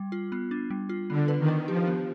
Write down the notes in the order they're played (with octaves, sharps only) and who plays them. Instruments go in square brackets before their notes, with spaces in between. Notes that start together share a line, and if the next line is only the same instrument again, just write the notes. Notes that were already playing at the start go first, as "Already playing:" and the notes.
Already playing: [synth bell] G3
F4
B3
D4
G3
F4
[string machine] D3 [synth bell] B3
[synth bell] B4
[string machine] D#3
[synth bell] D4
[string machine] F3 [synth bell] G4
[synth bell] B3